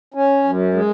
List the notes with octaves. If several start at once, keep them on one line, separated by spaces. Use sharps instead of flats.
C#4
F#2
G#3